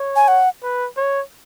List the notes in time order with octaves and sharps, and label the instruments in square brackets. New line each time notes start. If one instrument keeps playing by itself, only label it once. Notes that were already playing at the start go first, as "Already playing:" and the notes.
Already playing: [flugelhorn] C#5
[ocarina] G#5
F#5
[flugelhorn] B4
C#5